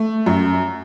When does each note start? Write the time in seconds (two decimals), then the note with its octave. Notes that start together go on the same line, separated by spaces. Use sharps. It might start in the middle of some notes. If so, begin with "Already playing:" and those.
Already playing: A3
0.26 F#2